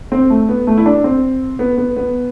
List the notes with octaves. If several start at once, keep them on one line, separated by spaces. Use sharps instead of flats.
C4
A3
B3
A3
E4
D4
C4
B3
B3
B3